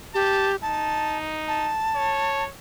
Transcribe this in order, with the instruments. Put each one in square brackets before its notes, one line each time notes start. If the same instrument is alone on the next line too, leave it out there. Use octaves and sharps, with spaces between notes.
[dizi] G4 [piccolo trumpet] A5
[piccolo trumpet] D#4 [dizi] A5
[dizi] A5
[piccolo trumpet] C#5